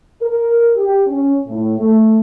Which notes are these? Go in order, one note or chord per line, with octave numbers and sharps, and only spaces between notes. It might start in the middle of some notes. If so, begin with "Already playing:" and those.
A#4
G4
C#4
A2
A3